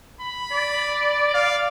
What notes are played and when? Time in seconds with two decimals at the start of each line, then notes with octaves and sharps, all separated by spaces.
0.21 B5
0.51 D5
1.34 D5 F5